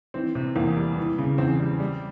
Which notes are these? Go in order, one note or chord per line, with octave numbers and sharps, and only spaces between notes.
E3 C4
C3
E2 A#3
G3
E3
C#3
E2 C4
G3
G3